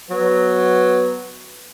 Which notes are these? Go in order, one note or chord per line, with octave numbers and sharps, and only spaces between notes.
F#3 B3 B4